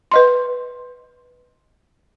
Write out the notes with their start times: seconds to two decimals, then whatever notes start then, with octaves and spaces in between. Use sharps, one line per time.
0.12 B4 D#5 C6